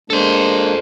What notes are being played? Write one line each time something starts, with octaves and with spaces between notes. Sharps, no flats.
G#3 A#3 D4 A4 C5